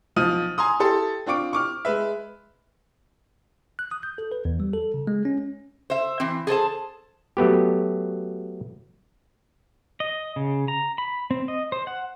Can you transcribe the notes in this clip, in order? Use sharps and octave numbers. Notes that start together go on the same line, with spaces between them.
B1 F3 D#6 F6 D#7
G#5 A#5 C6 D#6
E4 G4 A4 C6
C4 D4 F4 C#6 D6 D7
C#6 D6 F6
G#3 B4 E5
F#6
D#6
G6
A4
B4
E2
G3
A4
C#3
G#3
C#4
C5 E5
E3 C4
G#4 A4 C5 A5
F#3 A3 B3 G4
D#5
C#3
A#5
B5
C4
D#5
C5
F#5